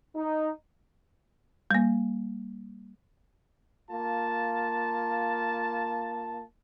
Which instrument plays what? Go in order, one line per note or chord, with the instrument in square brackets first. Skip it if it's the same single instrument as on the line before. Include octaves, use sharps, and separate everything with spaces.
[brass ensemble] D#4
[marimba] G3 A#3
[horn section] A#3 F4 A5